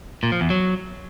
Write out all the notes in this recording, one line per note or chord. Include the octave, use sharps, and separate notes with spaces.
A#2
F3
E2
F#3